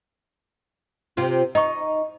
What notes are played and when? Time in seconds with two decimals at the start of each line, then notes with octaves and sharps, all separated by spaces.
1.17 C3 F4
1.55 D#4 D#5 C#6